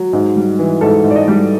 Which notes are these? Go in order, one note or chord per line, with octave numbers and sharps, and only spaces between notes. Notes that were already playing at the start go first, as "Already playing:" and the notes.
Already playing: F#3
G#2
G3
E3
G#2 A4
G#2
D5
D#5
G3